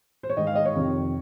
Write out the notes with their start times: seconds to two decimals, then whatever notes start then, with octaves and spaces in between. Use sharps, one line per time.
0.23 C5
0.30 C#5
0.37 G#2 D#3 D#5
0.47 F5
0.55 D#5
0.65 C#5
0.75 F2 C3 D#3